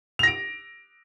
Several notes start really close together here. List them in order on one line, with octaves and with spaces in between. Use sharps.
F7 A#6 D7